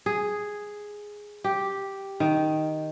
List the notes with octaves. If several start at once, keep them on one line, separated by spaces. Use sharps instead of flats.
G#4
G4
D#3